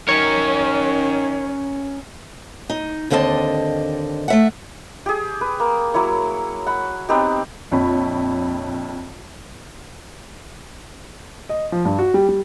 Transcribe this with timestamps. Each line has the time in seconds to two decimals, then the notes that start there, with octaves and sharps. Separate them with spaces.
0.09 D#3 C#4 A#4 C#5
2.70 D#4
3.10 D#2 D3 C4 E4 D#5 A5
4.28 A3 E5 F#5
5.06 G4 G#4
5.41 B4
5.60 A#3
5.94 F#3 A#3 E4 C#5
6.66 F#5 B5
7.09 B3 C4 D#4 G4
7.71 A#1 F2 C4 C#5 B5
11.49 D#5
11.72 F3
11.85 G2
11.99 F#4
12.14 G3
12.29 G3